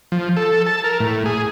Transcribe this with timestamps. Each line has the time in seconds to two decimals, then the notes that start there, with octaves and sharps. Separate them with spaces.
0.12 F3
0.37 A4
0.67 A5
0.84 A#4
1.00 A2
1.26 G#4